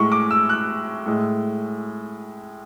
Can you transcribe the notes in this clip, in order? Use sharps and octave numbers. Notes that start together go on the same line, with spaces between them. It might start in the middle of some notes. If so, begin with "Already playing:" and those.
Already playing: A2 G#3 C#6
D6
E6
F#6
A2 G#3